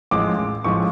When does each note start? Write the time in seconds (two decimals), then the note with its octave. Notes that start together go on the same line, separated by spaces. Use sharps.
0.11 A1 A2 F3 G#3 D6
0.64 A1 A2 F3 G#3 C#6